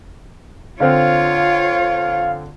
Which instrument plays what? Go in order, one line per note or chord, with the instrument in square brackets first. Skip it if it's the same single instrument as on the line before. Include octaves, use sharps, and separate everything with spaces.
[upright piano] D3 C4 [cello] F4 C#5 [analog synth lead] F5